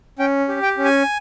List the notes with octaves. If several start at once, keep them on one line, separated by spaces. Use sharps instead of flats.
C#4 G5
G4
G5
C#4
G#5